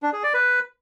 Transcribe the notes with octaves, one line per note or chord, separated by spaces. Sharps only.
D4
G#4
D5
B4